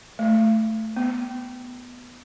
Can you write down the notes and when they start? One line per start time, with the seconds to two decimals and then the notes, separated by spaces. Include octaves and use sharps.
0.19 A3
0.97 B3